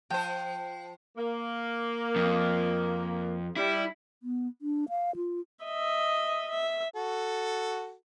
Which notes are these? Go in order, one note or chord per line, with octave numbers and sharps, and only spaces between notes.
F3 C5 G5
A#3
F2
G3 E4
B3
D4
F5
F4
D#5 E5
E5
F#4 A4